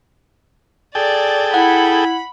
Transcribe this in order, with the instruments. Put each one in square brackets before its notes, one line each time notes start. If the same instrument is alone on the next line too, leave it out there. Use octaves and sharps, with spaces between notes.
[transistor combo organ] G#4 A4 G5 [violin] D5
[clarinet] E4 [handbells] F#5 [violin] B5